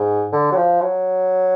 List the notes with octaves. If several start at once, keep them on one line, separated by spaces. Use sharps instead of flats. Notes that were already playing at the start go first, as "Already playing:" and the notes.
Already playing: G#2
D3
F#3
F3
F#3